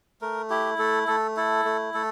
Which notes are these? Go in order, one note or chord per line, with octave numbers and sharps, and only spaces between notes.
A3 A#4
E4 G4
A3 A4
A3 A4
E4 A4
A3
A3 A4